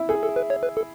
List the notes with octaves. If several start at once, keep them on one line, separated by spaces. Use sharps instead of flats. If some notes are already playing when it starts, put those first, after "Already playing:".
Already playing: E4
G#4 A4
A4
B4
C#5
B4
A4